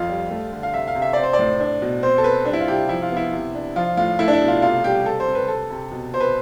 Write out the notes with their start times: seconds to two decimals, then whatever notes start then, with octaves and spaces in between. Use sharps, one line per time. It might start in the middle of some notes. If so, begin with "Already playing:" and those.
Already playing: F2 F4
0.09 G3
0.31 A3
0.52 D3
0.63 F5
0.74 C3 E5
0.88 F5
0.95 C3
1.02 E5
1.13 C4 D5
1.23 C5
1.33 D5
1.39 A2
1.60 D4
1.82 B2
2.03 C4 C5
2.18 A4
2.24 C4 B4
2.45 G3 D4
2.53 E4
2.61 F4
2.67 C3 G4
2.89 F3 E4
3.02 F4
3.11 B3
3.16 E4
3.33 C3
3.55 D4
3.76 F3 F4
3.97 A2 F4
4.19 A3 E4
4.28 D4
4.33 E4
4.41 B2
4.48 F4
4.62 C3 F4
4.84 G3 G4
5.05 C3 A4
5.20 C5
5.27 C3
5.35 B4
5.48 C3 A4
5.70 C3
5.91 B2
6.13 B2 C5
6.20 B4